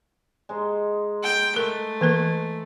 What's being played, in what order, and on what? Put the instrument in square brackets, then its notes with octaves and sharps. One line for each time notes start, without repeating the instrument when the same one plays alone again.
[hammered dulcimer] G#3 D#4 C5
[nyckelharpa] G5
[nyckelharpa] A3 [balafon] A#4
[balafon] E3 A#3 A#4